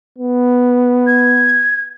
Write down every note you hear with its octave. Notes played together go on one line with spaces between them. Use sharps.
B3
G#6